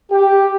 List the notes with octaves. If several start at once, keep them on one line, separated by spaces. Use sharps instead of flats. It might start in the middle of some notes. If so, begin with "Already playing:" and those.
G4